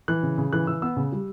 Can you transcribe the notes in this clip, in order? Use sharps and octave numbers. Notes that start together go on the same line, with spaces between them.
E3 F#6
C#3
C#3
E3 F#6
E3 E6
B3 E6
C#3
G3